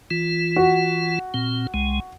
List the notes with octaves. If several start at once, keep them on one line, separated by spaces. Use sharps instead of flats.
E3 F4
F#4
A#2 C4
C2 G#3